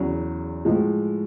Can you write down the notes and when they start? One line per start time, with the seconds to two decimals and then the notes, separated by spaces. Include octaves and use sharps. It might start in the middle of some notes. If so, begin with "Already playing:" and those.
Already playing: E2 C#3 F#3
0.65 A2 F3 G#3